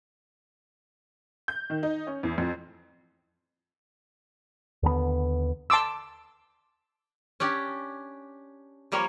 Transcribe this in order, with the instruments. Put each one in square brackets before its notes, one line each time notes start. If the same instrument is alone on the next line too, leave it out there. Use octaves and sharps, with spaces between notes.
[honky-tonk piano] G6
D#3
D#4
C#4
E2
F2
[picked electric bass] D#2 D3 F#3 B3
[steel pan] A5 C6 D6 E6
[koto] C#4 D4 G4 D5
F3 G3 A#3 A#4 C#5